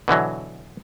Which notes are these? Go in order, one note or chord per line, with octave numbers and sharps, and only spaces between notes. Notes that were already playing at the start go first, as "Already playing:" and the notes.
B2 D3 E3 F#3